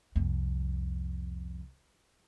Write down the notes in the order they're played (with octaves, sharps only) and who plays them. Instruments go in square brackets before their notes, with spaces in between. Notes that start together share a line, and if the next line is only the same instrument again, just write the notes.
[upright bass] C2 F2